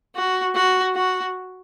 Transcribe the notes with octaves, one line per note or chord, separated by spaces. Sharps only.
F#4
F#4
F#4